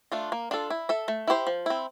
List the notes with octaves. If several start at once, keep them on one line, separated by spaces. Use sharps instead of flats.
A3 D4 F4
A#3
D4 F4 A4
E4
A4 E5
A3
E4 G4 C5
F3
C4 E4